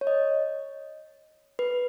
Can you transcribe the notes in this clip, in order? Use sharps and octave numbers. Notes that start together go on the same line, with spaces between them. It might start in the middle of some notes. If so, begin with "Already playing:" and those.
C#5
D#5
B4